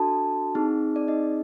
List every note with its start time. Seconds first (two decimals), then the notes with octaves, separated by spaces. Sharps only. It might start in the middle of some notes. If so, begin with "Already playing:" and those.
Already playing: D4 F#4 A4 A5
0.55 C4 D#4 G#4
0.96 D5
1.08 D#4 D#5